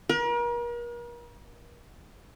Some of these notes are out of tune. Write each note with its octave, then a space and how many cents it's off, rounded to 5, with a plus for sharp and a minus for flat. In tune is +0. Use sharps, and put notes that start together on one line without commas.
A#4 +40